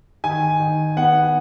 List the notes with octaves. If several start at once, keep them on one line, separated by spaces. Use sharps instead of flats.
D#3 G#5
D#3
B3 F#5